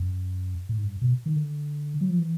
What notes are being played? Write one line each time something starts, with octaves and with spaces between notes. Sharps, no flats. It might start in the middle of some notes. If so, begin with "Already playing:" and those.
Already playing: F#2
A2
G#2
G2
B2
D#3
D3
F#3
F3
E3